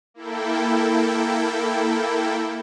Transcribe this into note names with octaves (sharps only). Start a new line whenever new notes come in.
A#3 E4 A4 G5